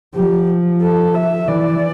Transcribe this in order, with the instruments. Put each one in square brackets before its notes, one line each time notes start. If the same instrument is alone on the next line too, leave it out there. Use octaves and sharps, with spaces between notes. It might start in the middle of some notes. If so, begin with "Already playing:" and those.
[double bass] F3 [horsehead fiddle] G4
[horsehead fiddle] A4
E5
[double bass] E3 [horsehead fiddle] D5